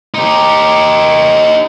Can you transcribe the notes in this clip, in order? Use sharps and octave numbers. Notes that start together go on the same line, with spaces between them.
D#4 G4